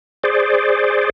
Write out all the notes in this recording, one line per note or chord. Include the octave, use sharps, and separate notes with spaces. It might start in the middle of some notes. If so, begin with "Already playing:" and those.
G#4 C5 D5